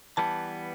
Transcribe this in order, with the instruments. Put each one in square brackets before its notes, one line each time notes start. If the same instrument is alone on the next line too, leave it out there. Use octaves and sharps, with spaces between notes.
[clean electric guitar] E3 G3 B3 [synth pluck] A5